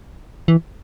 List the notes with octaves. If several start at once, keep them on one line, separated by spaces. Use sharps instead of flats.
E3